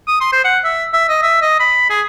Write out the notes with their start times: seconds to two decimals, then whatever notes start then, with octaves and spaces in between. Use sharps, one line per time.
0.08 D#6
0.21 C6
0.33 C5
0.45 F#5
0.64 E5
0.93 E5
1.09 D#5
1.22 E5
1.42 D#5
1.60 B5
1.90 G#4